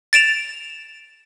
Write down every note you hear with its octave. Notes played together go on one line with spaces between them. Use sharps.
A6 D7 E7 F7